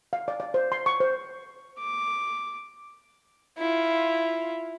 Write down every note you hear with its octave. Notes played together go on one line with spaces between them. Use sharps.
F5
D5
D5
C5
C6
C#6
C5
D6
E4 F4